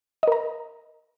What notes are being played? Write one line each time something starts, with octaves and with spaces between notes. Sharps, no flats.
A#4 D#5 A#5